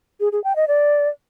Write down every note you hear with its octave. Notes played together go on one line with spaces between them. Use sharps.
G#4
G#4
G5
D#5
D5